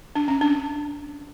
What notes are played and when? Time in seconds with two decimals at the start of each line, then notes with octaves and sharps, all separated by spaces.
0.15 D4
0.28 C#4
0.41 D4